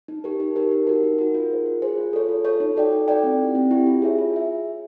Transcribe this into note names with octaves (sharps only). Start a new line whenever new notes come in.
D#4
G4 A#4
D#4
G4 A#4
D#4
F#4 A#4
D#4
F#4 A#4
F4
G#4 C5
F4
G#4 C5
F4
A4 C#5
F4
A4 C#5
D#4
F#4 A4 D5 G5
D#4
F#4 A4 D5 G5
C4
E4 G4
C4
E4 G4
F4
G#4 C#5 E5
F4
G#4 C#5 E5